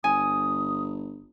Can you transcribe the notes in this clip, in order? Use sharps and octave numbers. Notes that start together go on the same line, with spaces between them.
G1 G#5 D#6